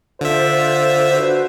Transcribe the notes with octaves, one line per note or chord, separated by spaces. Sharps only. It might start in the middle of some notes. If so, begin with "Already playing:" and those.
D3 F4 C5 E5
F#4 B4 C5